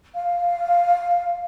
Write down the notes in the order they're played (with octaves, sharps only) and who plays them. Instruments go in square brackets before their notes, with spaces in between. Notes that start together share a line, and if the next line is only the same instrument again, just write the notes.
[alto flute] F5